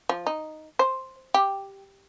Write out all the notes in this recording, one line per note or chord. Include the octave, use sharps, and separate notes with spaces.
F3
D#4
C5
G4